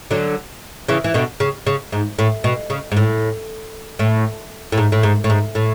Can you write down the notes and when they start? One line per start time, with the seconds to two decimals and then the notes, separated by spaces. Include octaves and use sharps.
0.11 D3 F#3
0.89 C#3 E3
1.04 E3
1.14 B2 D3
1.40 C#3
1.67 C#3
1.92 G#2
2.19 A2
2.44 B2
2.70 C#3
2.92 G#2
2.97 A2
3.99 A2
4.72 A2
4.77 G#2
4.92 A2
5.03 G#2
5.24 A2
5.30 G#2
5.55 A2